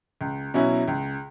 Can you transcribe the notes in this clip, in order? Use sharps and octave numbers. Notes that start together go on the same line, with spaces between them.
C#2
B2 F#3 C#4 E4
C#2